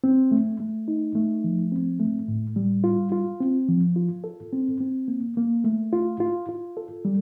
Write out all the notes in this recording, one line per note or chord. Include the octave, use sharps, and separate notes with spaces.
C4
A3
A3
D#4
A3
F3
C4
A3
A2
G3
F4
F4
C4
F3
F4
A4
C4
C4
A#3
A#3
A3
F4
F4
F4
A4
G3